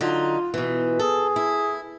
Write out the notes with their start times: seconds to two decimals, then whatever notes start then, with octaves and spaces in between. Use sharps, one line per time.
0.01 D3 F#3 D#4 F4
0.54 B2 E3
0.99 G#4 A4
1.36 E4